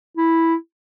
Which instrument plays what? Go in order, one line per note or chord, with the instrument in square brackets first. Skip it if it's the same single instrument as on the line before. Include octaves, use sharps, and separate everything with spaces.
[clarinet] E4